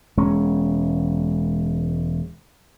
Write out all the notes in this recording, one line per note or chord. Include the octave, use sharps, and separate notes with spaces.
E1 G#3 C#4